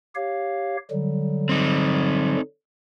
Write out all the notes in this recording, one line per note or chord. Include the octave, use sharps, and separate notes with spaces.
G4 C#5 F5
D3 F#3 G3
C4 D#4